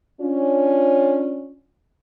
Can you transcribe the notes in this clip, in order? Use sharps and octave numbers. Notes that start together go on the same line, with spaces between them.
C#4 D4 F4